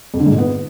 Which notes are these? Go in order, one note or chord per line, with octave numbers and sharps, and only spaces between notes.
F2
D3
G#2
A#2
B3